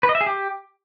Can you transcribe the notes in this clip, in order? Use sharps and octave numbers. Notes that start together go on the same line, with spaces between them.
B4
D#5
E5
G#4
G4